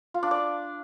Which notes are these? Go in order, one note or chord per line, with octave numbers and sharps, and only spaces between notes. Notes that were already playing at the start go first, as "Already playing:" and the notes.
F4
D4
D5